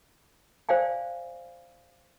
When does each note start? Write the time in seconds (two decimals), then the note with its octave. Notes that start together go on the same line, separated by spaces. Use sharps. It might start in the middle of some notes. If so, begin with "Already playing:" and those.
0.69 C5 D5 F5 G5 G#5